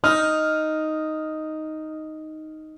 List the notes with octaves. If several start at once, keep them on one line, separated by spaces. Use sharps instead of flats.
D#4 F6